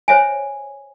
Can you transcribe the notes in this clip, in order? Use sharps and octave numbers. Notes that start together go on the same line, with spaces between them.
C5 C#5 E5 G#5